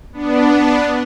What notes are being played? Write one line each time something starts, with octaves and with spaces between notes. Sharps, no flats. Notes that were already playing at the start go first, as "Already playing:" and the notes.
B3 D4